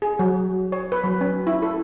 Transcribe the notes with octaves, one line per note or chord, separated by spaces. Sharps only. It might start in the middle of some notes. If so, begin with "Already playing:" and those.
G#4
F#3
C#5
B4
F#3
C#4
E4
A4